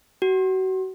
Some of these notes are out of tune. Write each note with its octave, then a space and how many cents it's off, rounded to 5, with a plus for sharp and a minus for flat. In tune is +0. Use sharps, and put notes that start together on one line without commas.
F#4 +30